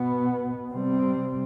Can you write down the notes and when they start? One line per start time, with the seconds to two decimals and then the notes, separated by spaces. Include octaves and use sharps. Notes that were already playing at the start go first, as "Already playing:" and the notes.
Already playing: B2 B3
0.70 C3 G3 C4